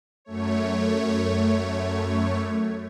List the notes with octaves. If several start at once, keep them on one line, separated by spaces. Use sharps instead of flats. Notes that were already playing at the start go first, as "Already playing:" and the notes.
F#2 A3 C#5